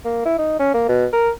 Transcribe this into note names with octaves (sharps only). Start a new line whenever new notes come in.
A#3
E4
D#4
C#4
A#3
B2
A#4